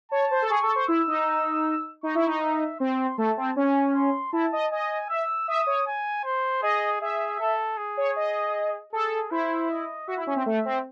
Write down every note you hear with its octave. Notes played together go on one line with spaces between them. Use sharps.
C#5 A5
C5
A4
G#4 C#6
A4
C5
E4 E6
D#4
D#4 C#6
E4
D#4
E5
C4 C6
A3 A5
C4
C#4 G#5
C6
E4 A5
D#5
D#5 G#5
E5 E6
E5 D#6
C#5
G#5
C5
G#4 D#5
G#4 E5
A4
G#4
C#5
D#5
G#4 A4
E4 C5
D#5
F#4 E5
E4
C#4
C4
A3 E5
C4